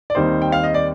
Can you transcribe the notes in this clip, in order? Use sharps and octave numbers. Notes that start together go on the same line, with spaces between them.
D5
D#2 D#3 G3 C4 D#4 C5
G5
F5
D#5
D5